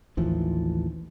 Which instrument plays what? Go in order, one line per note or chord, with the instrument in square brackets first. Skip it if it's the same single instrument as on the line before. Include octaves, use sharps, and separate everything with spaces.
[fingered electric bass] A1 D#2 E3 F3